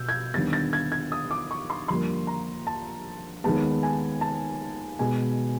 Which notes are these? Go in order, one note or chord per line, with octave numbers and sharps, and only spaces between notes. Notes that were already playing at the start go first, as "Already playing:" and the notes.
Already playing: B2 E6 G6
G#6
D#2 D3 G3 B3 A6
A6
G#6
G#6
D#6
D6
C#6
C6
F2 D3 G3 A#3 C6
A#5
A5
D#2 D#3 G#3 B3 A5
G#5
A5
B2 G#3 B3 G#5